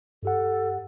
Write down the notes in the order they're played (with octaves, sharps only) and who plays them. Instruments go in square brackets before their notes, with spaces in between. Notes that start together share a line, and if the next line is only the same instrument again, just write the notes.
[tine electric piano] G2 G4 F#5 [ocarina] A4